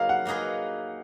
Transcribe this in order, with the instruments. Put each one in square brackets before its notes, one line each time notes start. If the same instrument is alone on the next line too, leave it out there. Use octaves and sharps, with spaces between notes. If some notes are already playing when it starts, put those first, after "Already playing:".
Already playing: [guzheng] F#3 A#3 D#4 G#4 B4 [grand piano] F5
[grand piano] F#5
[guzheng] F#3 A#3 D#4 G#4 B4